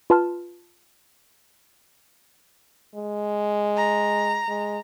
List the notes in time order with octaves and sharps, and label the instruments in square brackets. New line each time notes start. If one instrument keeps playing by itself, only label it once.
[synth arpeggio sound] F4 B4 A5 C6 F6
[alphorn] G#3
[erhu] A#5
[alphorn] G#3